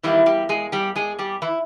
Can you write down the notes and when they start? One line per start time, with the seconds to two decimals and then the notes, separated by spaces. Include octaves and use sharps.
0.03 E2 D#3 E3 G3 A#3 E4
0.26 G3 G4
0.49 G#3 G#4
0.72 G3 G4
0.96 G#3 G#4
1.19 G3 G4
1.42 E3 E4